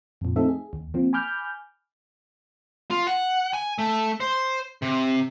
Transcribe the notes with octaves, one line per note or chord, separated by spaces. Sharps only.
F2 A#2
F3 A3 C4 D#4 A4 E5
G#4
D#2
F3 A#3 C4
G#5 B5 D6 F6 G6
F4
F#5
G#5
A3
C5
C3